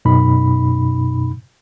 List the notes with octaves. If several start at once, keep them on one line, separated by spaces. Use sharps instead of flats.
F#2 B2 D#4 B5